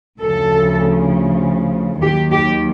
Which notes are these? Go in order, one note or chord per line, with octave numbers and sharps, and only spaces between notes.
D2 C#3 F3 A4
D#2 D#3 F#3 G4
G4